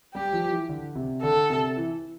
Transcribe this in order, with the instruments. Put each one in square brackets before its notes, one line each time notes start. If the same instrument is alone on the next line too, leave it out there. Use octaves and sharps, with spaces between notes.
[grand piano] G3 [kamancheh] G4
[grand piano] F3
E3
D3
C3
[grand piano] D3 [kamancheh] A4
[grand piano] C3
E3